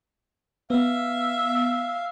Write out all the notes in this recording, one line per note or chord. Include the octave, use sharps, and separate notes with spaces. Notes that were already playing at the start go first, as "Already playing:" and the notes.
B3 E5 F5